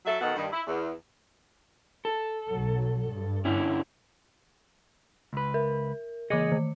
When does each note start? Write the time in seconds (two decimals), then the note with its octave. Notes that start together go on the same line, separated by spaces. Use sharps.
0.05 F#3 A4 E5
0.20 B2 D#3 A4 F#5
0.35 G2 D#3
0.51 E4
0.66 E2
2.05 A4
2.48 B1 F#3
3.08 G2
3.45 D3 C#4 E4
5.33 C#2 B4
5.54 A#4
6.30 C#2 E3 G#4 D#5 D6 C#7
6.52 D#3